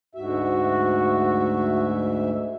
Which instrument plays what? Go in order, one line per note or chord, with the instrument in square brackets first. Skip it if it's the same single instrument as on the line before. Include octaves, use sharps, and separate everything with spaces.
[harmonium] D2 G#2 E5 [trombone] F#4